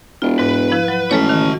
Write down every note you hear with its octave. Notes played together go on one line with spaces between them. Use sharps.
E1 F4
G#2 B4
F3 E4
F#3
A1 G#3 F#4 A4 C#5 A5
D#3